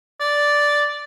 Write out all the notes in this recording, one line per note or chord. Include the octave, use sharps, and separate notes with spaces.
D5